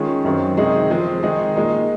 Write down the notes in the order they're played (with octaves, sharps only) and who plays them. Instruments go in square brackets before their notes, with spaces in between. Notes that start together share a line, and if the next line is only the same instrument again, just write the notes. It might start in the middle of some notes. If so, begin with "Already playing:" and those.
Already playing: [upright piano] D#3 G#3 C#4 F4 G#4
F#2 D#3 F#3 C4
C3 D#3 G#3 D#4 G#4
F3 G#3 C4
D#3 G#3 D#4 G#4
A#2 G#3 D#4 A#4